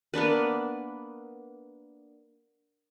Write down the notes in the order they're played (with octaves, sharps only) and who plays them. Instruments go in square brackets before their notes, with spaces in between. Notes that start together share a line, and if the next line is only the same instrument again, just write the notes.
[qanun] A#3 B3 D4 B4